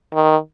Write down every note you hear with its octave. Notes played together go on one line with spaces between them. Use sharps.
D#3